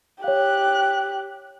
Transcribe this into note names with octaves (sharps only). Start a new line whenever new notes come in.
G4 C#5 F5 F#6